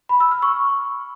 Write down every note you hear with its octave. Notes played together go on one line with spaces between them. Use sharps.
B5
E6
F6
C#6